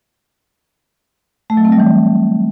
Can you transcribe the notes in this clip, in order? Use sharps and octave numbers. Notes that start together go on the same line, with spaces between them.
A3
F#3
C4
G3
E3